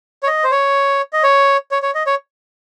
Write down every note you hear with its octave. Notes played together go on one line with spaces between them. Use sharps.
C#5
D#5
C5
C#5
D#5
C#5
C#5
C#5
D#5
C#5